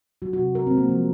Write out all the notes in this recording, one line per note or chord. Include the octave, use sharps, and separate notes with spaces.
F#3 F#4
F#4
C3
G#3 A#4
C4
G#3
A#3
F3